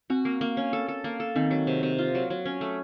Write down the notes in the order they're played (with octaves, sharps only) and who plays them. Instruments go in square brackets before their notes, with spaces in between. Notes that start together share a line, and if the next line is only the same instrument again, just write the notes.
[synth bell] C4 [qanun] F#4
[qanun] A#3
A#3
C#4
A4
A4
A#3
A4
[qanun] D#3 [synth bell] C4
[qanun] F#3
C3
C3
F4
F#3
F#3
C#4
A3